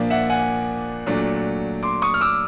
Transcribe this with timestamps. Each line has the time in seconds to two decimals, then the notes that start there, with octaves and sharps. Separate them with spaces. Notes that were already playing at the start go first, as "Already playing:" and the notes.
Already playing: A#2 F3 A#3 D4
0.10 E5 F#5
0.30 F#5 G#5
1.07 A#2 F#3 A3 D4
1.83 C6 D6
2.02 C#6 D#6
2.14 F6
2.21 D6 E6